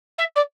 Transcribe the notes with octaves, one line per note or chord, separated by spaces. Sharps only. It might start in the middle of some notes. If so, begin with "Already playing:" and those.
E5
D5